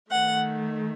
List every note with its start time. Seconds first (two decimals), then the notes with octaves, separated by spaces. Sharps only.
0.11 D#3 A3 F#5